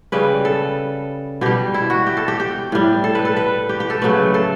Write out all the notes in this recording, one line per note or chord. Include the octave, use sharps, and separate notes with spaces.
C#3 G3 B4
A4
B2 G3 G4
E4
F#4
G4
A4
G4
G4
A2 G3
A4
B4
A4
B4
G4
G4
A4
C#3 F#3 A3 B4
A4